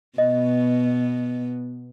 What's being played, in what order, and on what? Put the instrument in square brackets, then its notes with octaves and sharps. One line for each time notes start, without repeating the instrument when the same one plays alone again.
[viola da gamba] B2 B3 [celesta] D#5